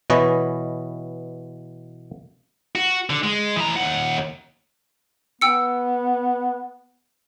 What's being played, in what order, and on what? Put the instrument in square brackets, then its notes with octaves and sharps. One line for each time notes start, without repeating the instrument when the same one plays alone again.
[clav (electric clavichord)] B2 E3 B4 C#5 D#5 G#5
[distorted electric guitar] F#4
D3
G#3
E3 A#5
D#2 F#5
[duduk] B3 [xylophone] G5 E6 C#7